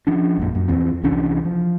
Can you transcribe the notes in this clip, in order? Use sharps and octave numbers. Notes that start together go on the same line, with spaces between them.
F3 C#4 D4
A#1 F#2 A#2
F#2
E2 E3 C4
C2 E3 C#4 D4
F3